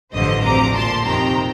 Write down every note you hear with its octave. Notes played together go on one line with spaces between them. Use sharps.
A1 G2 D3 F3 C5 D#5
D2 C3 F3 A#5 D6
A#1 A#2 F3 A5 C6
F2 C3 D#3 G5 A#5